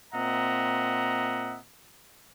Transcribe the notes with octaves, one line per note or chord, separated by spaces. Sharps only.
A#2 C4 D#5 E5 F#5 A#5